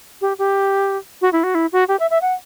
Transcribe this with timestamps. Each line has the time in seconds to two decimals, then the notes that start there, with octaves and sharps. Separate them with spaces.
0.21 G4
0.39 G4
1.22 F#4
1.33 E4
1.43 F#4
1.55 E4
1.72 F#4
1.88 G4
2.00 E5
2.10 E5
2.22 F#5